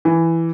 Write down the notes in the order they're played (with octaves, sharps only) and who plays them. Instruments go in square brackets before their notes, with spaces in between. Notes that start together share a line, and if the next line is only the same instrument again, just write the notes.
[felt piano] E3